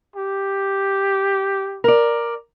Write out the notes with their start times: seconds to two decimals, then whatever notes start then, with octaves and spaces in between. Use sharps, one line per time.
0.16 G4
1.84 A#4 D5